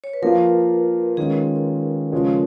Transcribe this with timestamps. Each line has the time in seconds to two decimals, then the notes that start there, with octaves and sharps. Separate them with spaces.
0.04 C#5
0.13 B4
0.22 F3 A#3 F4 A#4
1.17 D#3 G#3 C#4 F4 G#4
2.12 C#3 F3 G#3 C#4 F4